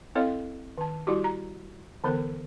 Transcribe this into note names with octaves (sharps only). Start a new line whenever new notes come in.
C4 E4 A4 C#5 D#5 F5
D#3 A5
G3 E4 F#4 G4
A#5
D3 E3 B3 A#4